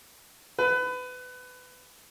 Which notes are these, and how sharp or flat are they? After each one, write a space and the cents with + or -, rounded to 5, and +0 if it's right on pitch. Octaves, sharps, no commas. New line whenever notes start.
B4 +25